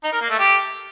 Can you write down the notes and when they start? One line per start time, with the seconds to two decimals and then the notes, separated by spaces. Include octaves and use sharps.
0.04 D#4
0.12 A#4
0.21 A#3
0.30 A3
0.39 G4